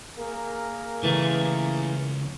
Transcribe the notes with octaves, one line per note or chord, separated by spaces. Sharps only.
A#3 G#4 A#4
C#2 E3 A3